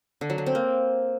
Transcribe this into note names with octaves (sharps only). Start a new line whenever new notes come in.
D3
F#3
D3
C4
A#3